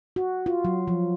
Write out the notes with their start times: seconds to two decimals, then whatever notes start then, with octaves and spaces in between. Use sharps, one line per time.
0.16 F#4
0.46 F4
0.65 F#3
0.88 F3